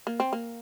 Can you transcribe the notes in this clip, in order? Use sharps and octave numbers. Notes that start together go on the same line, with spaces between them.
A#3
C4
A#3